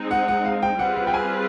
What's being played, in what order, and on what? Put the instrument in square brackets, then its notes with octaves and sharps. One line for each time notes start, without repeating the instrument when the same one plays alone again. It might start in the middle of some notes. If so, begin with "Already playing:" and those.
Already playing: [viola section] G#3 C4 D#4
[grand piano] F#5
F#5
F5
G5
[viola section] G3 C4 F4 G#4 B4 [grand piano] F#5
[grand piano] F#5
G5
G#5